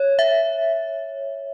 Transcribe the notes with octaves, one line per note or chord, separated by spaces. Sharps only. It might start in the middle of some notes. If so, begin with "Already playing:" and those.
Already playing: C#5
E5